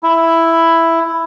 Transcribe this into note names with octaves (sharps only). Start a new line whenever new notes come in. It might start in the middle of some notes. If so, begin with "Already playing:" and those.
E4